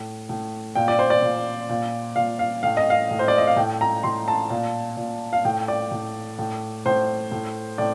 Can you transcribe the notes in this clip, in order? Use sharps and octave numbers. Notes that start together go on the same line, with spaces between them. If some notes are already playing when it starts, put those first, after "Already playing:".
Already playing: A2
A2
A#2 G5
D5
C5
D5
A#2
A#2
A#2 F5
F5
A2 F5
D#5
F5
A2
C5
D5
D#5
F5
A2 G5
A#5
A2 C6
A5
A#2
A#2
F5
A2 G5
D5
A2
A2
A2 C5
A2
A2 D5